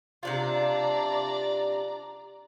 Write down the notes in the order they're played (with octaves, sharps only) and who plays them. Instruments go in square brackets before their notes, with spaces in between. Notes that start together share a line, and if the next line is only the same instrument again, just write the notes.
[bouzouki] C3 D4 F4 [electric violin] D5 A#5